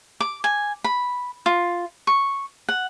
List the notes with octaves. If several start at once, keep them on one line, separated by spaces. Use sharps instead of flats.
D6
G#5
B5
F4
C#6
F#5